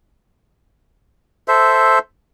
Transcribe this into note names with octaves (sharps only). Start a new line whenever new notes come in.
A4 C5 E5